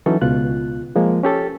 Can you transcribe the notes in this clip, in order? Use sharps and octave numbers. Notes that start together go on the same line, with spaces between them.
E3 F#3 C#4 D#4 A4
C#2 B2 F4 F#6
F3 G#3 A#3
C#4 G4 A4